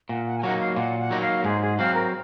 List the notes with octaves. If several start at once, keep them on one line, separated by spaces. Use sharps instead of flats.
A#2 F#5
F#5
G#5
F#3 A#3 D#4 F#5
F5
A#2 F#5
F#5
F#3 A#3 D#4
F5
G#2 G#4
G#4
F#3 C4 F5
A#4